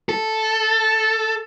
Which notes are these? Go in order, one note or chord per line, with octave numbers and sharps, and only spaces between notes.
A4